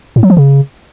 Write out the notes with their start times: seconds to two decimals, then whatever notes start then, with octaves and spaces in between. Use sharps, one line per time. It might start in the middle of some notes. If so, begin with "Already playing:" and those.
0.16 A2
0.23 F#3
0.30 F3
0.37 C#3